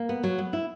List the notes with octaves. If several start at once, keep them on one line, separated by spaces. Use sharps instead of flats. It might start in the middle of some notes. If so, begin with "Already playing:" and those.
Already playing: A#3
B3
F#3
B3
E4